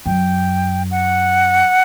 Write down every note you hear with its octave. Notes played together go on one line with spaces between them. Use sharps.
F#2 G5
F#5